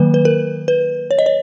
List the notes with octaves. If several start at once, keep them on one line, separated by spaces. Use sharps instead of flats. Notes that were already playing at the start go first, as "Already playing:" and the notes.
Already playing: D#3 F#3 A#3 B4
B4
A#4
B4
C#5
D#5
C#5